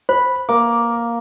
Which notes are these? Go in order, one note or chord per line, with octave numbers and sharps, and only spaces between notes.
C5 B5
A#3 D6